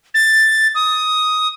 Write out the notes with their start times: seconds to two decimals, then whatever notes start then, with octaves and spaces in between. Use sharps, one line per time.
0.14 A6
0.75 D#6